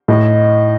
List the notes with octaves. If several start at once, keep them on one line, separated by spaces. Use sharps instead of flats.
A2 D#5